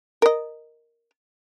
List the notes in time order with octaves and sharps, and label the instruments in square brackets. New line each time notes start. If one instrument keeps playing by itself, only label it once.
[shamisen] A#4 D#5